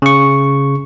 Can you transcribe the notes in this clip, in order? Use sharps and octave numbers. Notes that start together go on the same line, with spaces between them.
C#3 C#6